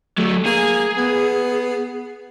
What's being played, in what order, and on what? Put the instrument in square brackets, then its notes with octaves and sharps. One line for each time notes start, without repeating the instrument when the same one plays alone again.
[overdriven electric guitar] F#3 A3
[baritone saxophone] A#3 [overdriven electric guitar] G#4
[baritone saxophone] B3